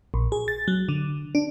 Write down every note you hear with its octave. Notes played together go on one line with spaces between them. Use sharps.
A#1
G#4
A6
F#3
D3
D4